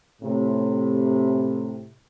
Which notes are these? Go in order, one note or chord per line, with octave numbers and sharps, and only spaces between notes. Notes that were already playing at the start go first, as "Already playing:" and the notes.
A2 C3